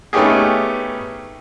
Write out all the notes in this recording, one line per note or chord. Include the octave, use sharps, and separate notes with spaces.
A3 B3 C#4 D#4 G4 G#4